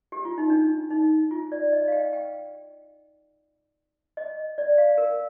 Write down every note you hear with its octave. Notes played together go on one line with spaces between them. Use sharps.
G4
F4
D#4
D4
D#4
F4
D5
D#5
F5
G5
G5
D#5
D5
F5
A#4